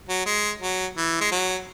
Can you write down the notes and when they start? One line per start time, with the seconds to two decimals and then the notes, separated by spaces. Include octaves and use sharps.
0.09 F#3
0.26 G#3
0.61 F#3
0.97 E3
1.21 G#3
1.31 F#3